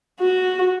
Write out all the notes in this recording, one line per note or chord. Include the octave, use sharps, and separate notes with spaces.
F#4